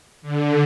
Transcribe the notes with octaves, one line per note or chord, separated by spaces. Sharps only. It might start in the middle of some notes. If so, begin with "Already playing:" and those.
D3